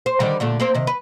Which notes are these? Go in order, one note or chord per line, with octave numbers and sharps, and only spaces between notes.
C5
D3 D#3 G3
A#2 D3 A3
A#3 C4 C5
C3 D#3
B4